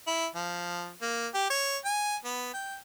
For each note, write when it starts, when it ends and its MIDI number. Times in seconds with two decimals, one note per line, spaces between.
0.07 0.27 64
0.35 0.90 53
1.02 1.27 58
1.34 1.49 67
1.50 1.78 73
1.85 2.16 80
2.25 2.53 59
2.53 2.76 79